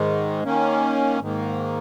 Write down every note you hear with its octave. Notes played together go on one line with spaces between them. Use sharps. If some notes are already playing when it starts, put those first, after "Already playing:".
Already playing: G#2 D#3 G#3
D#3 A#3 C#4
G#2 D#3 A#3